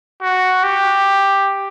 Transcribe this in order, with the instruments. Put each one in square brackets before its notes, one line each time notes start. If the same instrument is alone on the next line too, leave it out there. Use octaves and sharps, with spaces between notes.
[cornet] F#4
G4